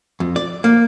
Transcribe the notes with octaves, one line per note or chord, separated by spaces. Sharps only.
F2
D5
A#3